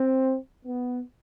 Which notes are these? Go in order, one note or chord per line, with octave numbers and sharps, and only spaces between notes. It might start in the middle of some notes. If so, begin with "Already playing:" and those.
Already playing: C4
B3